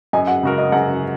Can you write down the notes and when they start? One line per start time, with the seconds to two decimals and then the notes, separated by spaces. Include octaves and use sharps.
0.13 F#2 D#5 G#5
0.27 F#5
0.43 C#3 G#3 F#4 A#4
0.58 D#5
0.72 F#2 F#5